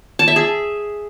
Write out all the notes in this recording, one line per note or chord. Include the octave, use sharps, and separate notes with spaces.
A5
E5
G#4